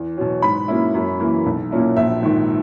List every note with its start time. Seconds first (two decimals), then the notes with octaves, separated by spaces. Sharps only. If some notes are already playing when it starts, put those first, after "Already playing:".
Already playing: E2
0.17 B2 F#3
0.42 G#2 B5
0.68 F#3 A#3 C#4 E4
0.94 F#2
1.20 E3 A#3
1.46 B1
1.71 A#2 A#3 C#4 E4
1.96 A#1 E5
2.22 G#2 D#3